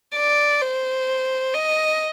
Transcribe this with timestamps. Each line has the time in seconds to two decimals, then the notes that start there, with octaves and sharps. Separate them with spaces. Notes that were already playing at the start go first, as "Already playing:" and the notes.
0.15 D5
0.61 C5
1.54 D#5